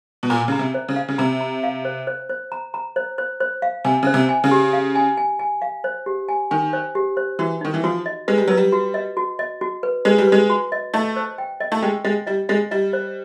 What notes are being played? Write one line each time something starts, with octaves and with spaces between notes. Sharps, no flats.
B2
A#2 A#5
C#3 A#5
C3
C5
C#3
F5
C#3
C3 A#5
A#5
F5
C5
C5
C5
A#5
A#5
C5
C5
C5
F5
C3 G#5
C#3 C5
C3
G#5
C#3
G4
F5
G#5
G#5
G#5
F5
C5
G4
G#5
D#3 G#5
C5
G4
C5
E3 F#4
D#3 D#4
E3
F3 F#4
D#5
G#3 B4
G3
F#3 B4
G3
F#4
D#5
F#4
D#5
F#4
B4
G#3 B4
G3
G#3 B4
F#4
D#5
A3 D#5
C5
G5
D#5
A3
G#3 G5
G#3 D#5
G3 D#5
G#3 D#5
G3 D#5
C5